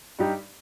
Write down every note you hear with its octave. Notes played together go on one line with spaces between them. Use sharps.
G2 G3 D#4 G4